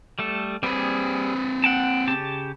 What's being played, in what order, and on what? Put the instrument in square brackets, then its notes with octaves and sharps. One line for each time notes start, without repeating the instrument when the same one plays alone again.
[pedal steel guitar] G3 A3 A4
[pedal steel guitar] G3 G#4 [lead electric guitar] C4 B4
[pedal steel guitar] F#5 G5 A5
C#3 G4 A5